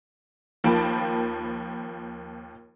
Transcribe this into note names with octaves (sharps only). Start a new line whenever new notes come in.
D#2 F3 A#3 G5 A5 B5